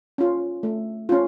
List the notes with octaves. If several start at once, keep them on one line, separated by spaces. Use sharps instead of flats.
C#4 F4
A3
C#4 F4